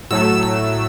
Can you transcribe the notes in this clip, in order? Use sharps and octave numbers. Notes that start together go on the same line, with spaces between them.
A2 F#3 A3 E6
E6